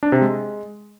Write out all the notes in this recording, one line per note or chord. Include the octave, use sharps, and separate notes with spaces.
D4
C3
G#3